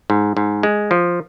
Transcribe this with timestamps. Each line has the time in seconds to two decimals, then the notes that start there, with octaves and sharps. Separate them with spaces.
0.10 G#2
0.37 G#2
0.63 G#3
0.91 F3